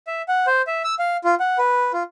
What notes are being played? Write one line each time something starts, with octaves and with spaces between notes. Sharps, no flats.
E5
F#5
C5
E5
E6
F5
F4
F#5
B4
F4